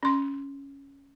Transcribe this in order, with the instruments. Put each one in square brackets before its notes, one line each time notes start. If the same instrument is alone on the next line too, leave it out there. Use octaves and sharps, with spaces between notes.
[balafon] C#4 C6